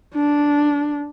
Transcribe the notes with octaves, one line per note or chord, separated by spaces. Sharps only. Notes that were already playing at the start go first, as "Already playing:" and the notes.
D4